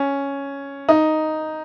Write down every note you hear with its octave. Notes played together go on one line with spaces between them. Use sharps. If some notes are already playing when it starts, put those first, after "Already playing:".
Already playing: C#4
D#4